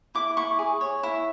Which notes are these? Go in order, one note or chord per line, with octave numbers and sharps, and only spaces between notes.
E4 D6
E4 C#6
G#4
C#5
E4